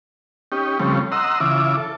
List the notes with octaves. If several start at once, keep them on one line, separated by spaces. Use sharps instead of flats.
C#4 D#4 G4
C#3 F3 G3 A3 C4 C#4
D#5 F#5 A#5 C6 E6
C#3 E3 F4 E5 D6
A4